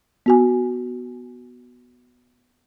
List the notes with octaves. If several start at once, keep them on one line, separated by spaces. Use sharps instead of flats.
B3 F#4 G#5